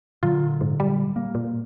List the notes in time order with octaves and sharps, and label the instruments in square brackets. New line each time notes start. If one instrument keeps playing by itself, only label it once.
[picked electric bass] A#2 D3 F#3 [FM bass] F4
[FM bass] G#2
G3
[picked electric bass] A#3
[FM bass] A#2